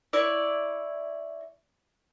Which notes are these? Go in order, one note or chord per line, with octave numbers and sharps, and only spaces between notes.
E4 C#5 D5